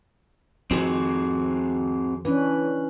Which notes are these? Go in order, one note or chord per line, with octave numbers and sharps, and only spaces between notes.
F2 D#3 C4 F#4 G#4
E3 C#4 D4 B4